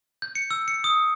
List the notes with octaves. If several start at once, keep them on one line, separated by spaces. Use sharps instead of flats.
G6
C#7
E6
C#7
D#6